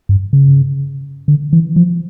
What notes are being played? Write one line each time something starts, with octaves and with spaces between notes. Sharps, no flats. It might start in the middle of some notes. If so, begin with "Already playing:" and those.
G2
C#3
D3
E3
F3